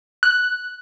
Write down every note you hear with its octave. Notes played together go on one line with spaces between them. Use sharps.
F#6